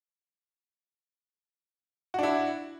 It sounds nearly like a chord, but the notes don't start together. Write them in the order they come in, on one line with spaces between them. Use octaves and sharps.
F#4 D4 E4